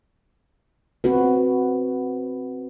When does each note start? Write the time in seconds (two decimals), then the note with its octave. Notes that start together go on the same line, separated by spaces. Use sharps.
1.04 C4 F#4 B4